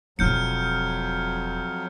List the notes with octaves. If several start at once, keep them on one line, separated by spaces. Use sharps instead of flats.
E1 F2 F#3 F4 F6 G6 C#7